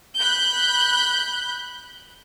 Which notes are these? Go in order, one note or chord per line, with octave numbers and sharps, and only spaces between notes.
B5 F#6 G6